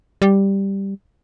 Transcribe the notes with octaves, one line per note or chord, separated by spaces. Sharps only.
G3